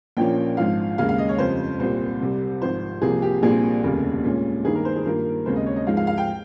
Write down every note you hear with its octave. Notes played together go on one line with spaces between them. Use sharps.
A#1 A#2 F3 A#3 C#4 G5
G#1 G#2 F3 F5
D#2 C#3 G#3 F5
F5
D#5
C#5
F2 C#3 G3 C5
C2 A#2 G3 C4 C5
C2 C3 G3
G#1 G#2 F3 C5
C2 C3 F3 A#3 G#4
G4
A#1 A#2 G3 C4 G#4
F1 D#2 C#3 G3
A#2 G#3 C#4
G2 D#3 A#3 D#4 G#4
A#4
C5
G#4
G2 D#3 A#3 F4 A#4
D#2 C#3 G#3 C4 C5
D#5
C#5
D#5
G#2 F3 G#3 F5
F5
F5
G5